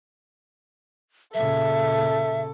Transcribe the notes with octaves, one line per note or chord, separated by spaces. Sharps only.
A#2 C#3 A4 E5